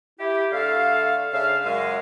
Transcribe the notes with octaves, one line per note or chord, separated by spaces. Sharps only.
E4 G4
D3 A3 A4 F5
C#3 D4 E5 F5
F#2 G#3 F5